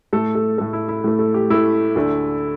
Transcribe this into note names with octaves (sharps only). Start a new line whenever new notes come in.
A2 A3 A4
A4
A2 A3 A4
E4
E4
A2 A3
A4
G4
A2 A3 E4
D2 D3 A3